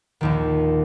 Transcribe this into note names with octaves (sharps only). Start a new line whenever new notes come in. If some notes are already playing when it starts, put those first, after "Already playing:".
A#1 D#2 D#3